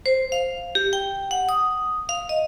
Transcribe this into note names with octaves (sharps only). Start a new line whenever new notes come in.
C5
F5
G4
G5
F#5
D#6
F5
D#5